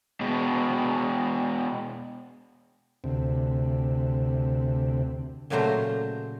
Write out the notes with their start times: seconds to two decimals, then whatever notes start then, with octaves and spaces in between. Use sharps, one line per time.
0.21 B2 G#3
3.04 D2 C3
5.50 A#2 C#3 F#3 A3 C5 A#5